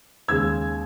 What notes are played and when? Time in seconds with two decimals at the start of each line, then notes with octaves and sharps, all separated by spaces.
0.28 D#2 C#3 G#3 E6 G#6